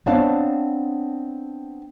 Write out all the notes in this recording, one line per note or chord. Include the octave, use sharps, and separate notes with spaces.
B3 C4 D4 C#5 F5 A5